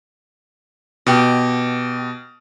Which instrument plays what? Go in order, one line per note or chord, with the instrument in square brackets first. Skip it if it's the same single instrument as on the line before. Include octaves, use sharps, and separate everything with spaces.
[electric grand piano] B2 [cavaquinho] G4 F#5